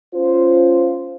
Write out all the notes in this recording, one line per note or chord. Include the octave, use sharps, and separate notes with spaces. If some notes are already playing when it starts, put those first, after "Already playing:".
C#4 F4 C5